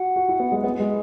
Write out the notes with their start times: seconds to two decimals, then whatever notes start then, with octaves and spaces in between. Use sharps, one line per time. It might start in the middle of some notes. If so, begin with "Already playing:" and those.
Already playing: F#4 F#5
0.16 F#4
0.29 E4
0.40 B3
0.52 G#3
0.64 B3 B4
0.80 G#3